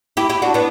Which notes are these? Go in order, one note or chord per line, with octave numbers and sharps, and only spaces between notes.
E4 G4
E4 G4
D4 F#4
B3 D4